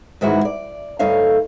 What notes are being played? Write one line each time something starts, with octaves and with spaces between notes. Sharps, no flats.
G#2 D#3 E3 G#3 E4 F#4
D5
D2 G2 A3 D#4 C#5 F5